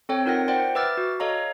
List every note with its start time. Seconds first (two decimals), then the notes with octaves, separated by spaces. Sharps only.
0.09 C4 A4 C#5 G5
0.26 D#4 F4 A#4 F#5 A#6
0.48 C5 D5 F#5 G5
0.75 B4 E5 D6 E6 F6 A6
0.97 F#4
1.20 A4 C#5 D#5 F5 A#5